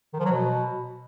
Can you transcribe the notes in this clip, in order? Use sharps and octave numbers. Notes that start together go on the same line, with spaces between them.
D#3
F3
F#3
B2